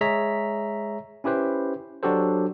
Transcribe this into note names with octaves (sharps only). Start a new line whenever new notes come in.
G#3 G#4 C#5 E5 A#5 B6
C#4 E4 G4 B4 C5
F#3 D4 F#4 G4 A4 C5